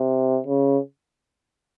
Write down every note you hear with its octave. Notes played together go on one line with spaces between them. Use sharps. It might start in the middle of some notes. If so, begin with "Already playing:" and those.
Already playing: C3
C#3